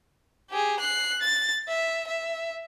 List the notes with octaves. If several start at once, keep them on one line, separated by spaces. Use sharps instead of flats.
G4 G#4
F#6 C7
A6
E5
E5